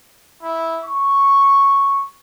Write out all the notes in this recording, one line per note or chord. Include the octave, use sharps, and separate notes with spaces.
E4
C#6